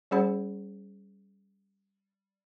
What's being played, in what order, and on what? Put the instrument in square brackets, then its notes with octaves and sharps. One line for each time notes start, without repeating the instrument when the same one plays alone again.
[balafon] G3 C#4 G#4 C5 F#5 B5